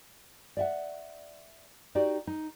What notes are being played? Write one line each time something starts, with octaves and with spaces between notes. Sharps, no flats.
D5 E5 F#5
D#4 F#4 G4 D5
D#4